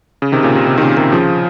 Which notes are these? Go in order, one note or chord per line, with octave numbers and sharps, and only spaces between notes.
C#3
C3 D#3
A#2 C#3
C3
C3
D#3
A#2 C#3
C3 D#3
C#3 F3